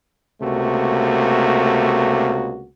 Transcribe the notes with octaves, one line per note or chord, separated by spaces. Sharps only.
C#2 C3 A3 A#3 F#4